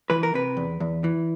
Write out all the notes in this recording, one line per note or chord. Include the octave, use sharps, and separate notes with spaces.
E3 B4
A#4
C3 B4
E2
E2
E3